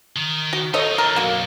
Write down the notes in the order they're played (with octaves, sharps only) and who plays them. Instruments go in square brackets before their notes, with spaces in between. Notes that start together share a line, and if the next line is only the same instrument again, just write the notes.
[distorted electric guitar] D#3
[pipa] F#4
[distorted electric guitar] D#4 F4 [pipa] A4 C#5 D#5
[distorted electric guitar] E3 D4 [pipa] A#4
[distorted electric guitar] F#2 B2 [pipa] A#3 F#4